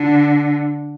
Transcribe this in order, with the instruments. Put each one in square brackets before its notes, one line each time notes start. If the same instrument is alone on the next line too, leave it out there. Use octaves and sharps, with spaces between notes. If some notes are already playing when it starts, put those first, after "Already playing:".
Already playing: [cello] D3